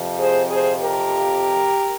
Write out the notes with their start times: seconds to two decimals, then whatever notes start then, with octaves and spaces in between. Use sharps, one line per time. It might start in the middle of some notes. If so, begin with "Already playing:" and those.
Already playing: F2 C3 F3
0.20 G#4 C5
0.50 G#4 C5
0.81 G4 A#4